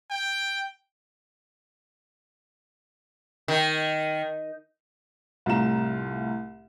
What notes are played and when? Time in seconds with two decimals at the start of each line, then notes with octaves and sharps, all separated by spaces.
0.11 G5
3.48 D#3
5.46 C2 A2 F4 A#5 E7